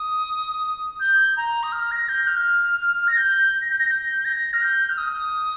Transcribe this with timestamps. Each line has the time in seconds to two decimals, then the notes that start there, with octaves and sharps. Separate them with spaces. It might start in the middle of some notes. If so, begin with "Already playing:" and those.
Already playing: D#6
1.00 G6
1.37 A#5
1.63 D#6
1.72 F6
1.91 A#6
2.08 G6
2.27 F6
3.07 A#6
3.17 G6
3.61 A#6
3.70 G6
3.79 A#6
3.89 G6
4.25 A#6
4.53 F6
4.62 G6
4.89 F6
4.98 D#6